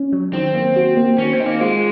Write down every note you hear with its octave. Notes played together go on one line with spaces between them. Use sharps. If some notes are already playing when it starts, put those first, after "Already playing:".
Already playing: C#4
F#3
D#3 C4
A#3
F#4
A#3
D#3 C#4
C4
D#4
A#3
G#3 F4